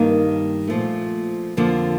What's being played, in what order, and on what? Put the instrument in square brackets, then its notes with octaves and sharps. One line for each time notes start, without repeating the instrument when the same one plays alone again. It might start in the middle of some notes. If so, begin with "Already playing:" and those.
Already playing: [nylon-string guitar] G2 D#3 A#3 D#4
A#2 F3 A3
F2 D3 F3 A#3